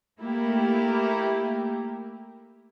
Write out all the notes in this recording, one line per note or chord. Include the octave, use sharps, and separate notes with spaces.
A3 A#3 E4 G4 A#4